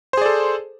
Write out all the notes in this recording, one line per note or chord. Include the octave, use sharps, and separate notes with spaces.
G#4 A4 C5 D5